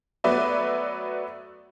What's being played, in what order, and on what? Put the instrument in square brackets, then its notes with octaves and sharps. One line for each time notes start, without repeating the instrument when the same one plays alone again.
[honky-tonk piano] F#3 A3 B3 B4 D5 E5